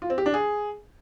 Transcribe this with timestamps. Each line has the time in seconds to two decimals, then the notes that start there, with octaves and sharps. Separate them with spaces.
0.02 F4
0.10 C4
0.18 G4
0.26 D4
0.34 G#4